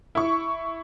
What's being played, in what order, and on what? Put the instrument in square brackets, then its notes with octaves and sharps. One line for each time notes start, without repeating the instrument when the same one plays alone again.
[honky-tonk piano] E4 C#6